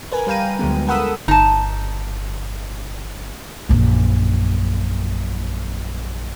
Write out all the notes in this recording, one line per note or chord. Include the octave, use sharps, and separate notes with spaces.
A#4 B4 G#5
G3 B4 F5 G5 A#5 D#7
D2 D3 F#3 G#3 B3
A4 A#4 F#5 B5 D#6 E6
G1 D#4 A5
A#1 F#2